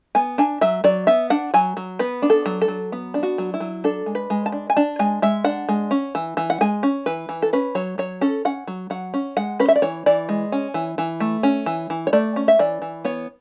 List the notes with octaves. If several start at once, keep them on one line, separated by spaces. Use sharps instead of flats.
B3 G#5
D4 G#5
F#3 E5
F#3 D5
B3 E5
D4 F#5
F#3 G#5
F#3
B3 B4
D4
A4
F#3
A4
F#3
B3
D4
F#4
F#3
E4
F#3
D4 A4
G#3
B4
G#3
A5
D4
G#5
D4 A5
G#3 G#5
G#3 E5
D4 F#5
G#3
C#4
E3
E3
F#5
G#3 G#5
C#4
E3 B4
E3
A4
C#4 B4
F#3 C#5
F#3 C#5
C#4 A4
C#4 F#5
F#3
F#3 F#5
C#4
G#3 F#5
C#4 B4
E5
D5
E3 C#5
E3 D5
G#3
C#4
E3
E3
A3
C#4
E3
E3
C#5
A3 D5
C#4
E5
E3 D5
E3
B3 C#5